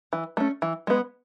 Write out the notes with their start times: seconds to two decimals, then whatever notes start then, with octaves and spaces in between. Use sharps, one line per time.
0.13 E3
0.37 A3 C#4
0.62 E3
0.87 G#3 B3